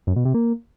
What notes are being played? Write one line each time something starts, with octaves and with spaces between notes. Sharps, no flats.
F#2
B2
C3
A#3